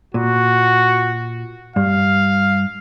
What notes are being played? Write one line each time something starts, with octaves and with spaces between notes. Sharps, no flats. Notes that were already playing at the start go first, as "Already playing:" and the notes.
A#2 F#4
G2 F5